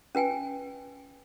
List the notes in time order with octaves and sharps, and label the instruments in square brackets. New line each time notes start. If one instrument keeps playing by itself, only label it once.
[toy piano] C#4 B4 G5 G#5